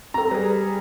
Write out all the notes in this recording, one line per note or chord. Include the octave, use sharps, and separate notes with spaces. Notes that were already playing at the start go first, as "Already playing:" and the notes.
C4 A4 A#5
G3 G#4 B4